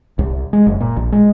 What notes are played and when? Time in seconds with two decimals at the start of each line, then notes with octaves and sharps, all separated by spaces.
0.19 C2
0.53 G#3
0.67 F#1
0.80 A#2
0.97 A#1
1.12 G#3